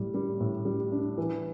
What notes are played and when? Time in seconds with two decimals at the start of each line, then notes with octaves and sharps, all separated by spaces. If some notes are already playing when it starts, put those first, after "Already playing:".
Already playing: A2 G3
0.14 G3
0.40 A2
0.65 G3
0.92 D4
1.18 E3